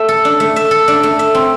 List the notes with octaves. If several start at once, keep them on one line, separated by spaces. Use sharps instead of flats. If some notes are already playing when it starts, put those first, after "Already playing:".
Already playing: A3 E5
A4
D4
A3
E5
A4
D4
A3
E5
C4